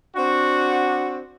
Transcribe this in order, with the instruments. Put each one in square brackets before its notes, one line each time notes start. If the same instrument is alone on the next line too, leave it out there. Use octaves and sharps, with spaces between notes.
[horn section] C4 D4 F#4